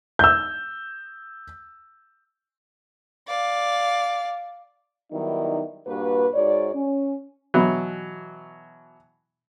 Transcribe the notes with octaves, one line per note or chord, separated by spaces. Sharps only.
E6 G6
D5 F5
D#3 F#3 G3 B3 D#4 E4
G2 A#2 A#3 F#4 B4
G#2 F#4 C#5 D5
C#4
B2 E3 F#3